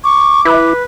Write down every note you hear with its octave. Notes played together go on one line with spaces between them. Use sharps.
C#6 D6
E4 B4